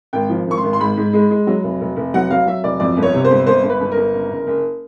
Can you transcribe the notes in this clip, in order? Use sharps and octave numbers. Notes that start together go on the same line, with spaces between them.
G#1 G5
F3
G#1 C#6
C6
G#1
C6
G#2 B5
G#2
G#3
G#3
F#3
F1
F1
F1
F#3 F#5
F#3 F5
F#3 E5
F1 D5
F2 D5
G1
C#5
C3
C5
G1
G1 C5
G1
B4
G1
A#4
G1
F#1
F#1
F#1